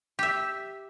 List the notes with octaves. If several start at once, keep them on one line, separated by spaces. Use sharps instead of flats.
G4 E5